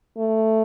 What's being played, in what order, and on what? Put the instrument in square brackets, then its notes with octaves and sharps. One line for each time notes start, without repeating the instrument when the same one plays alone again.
[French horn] A3